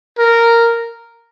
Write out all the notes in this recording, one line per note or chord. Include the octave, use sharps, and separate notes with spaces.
A#4